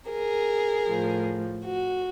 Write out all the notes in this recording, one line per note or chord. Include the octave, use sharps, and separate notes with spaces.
G#4 A#4
A2 F3
F#4